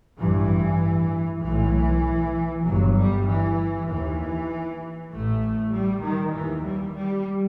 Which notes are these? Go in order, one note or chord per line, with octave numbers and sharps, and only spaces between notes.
A1 G2 E3
B1 A2 E3
G1 G2 F#3
G3
E3
D#2 E3
A1 A2 A3
G3
D#3
D#2 E3
G3
G3